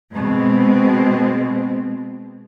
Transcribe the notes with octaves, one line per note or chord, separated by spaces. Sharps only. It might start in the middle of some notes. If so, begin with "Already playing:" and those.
B2 G#3 C4